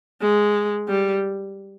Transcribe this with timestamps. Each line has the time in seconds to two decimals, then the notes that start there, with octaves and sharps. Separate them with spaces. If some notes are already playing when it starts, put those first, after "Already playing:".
0.21 G#3
0.89 G3